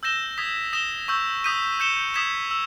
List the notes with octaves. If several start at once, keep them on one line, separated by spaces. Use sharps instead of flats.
E6 G6 A#6 E7 G7
D#6 G#6 B6
D#6 A#6 E7 G7
C#6 E6 G6
D#6 G6 B6 D#7
G6 C#7 E7 G7
D#6 G#6 B6 E7
E6